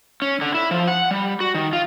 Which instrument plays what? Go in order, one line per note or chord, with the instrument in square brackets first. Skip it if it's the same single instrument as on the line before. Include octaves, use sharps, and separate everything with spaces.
[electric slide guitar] C#4
D3
E4
F3
F#5
G3
F#4
D#3
F4